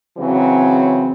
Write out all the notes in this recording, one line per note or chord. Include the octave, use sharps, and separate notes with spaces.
C#3 E3 F#3 C4